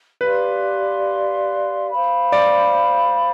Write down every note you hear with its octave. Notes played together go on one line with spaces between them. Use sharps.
G4 B4 D5 F5 C6
C5 F5 B5
D5